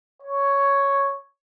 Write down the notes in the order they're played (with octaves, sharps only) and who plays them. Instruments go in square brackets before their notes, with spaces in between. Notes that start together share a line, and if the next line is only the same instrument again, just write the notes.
[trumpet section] C#5